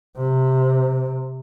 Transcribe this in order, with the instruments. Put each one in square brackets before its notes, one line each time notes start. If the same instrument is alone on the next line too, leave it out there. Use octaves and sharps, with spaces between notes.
[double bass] C3